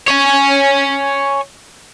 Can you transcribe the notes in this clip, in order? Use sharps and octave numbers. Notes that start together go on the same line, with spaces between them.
C#5 G#5